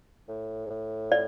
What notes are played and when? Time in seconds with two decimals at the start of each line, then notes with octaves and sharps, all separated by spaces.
0.28 A2
0.66 G#2
0.70 A2
1.12 D5